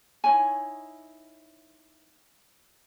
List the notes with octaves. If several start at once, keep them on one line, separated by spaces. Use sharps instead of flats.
D#4 E4 C#5 G#5